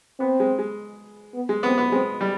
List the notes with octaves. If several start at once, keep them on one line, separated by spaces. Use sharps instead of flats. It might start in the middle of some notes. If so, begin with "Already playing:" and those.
B3 C4
G#3
G#3
B3
G#3
B3 C4
B3
G#3 C4
G3